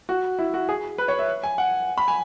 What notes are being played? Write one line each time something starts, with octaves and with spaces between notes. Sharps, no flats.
F#4
E4
F#4
G#4
B4
C#5
E5
G#5
F#5
B5
G#5